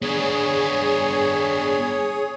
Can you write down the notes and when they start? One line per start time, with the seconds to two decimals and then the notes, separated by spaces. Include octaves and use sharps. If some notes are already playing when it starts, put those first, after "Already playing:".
0.02 B3 D4 G#4 C#5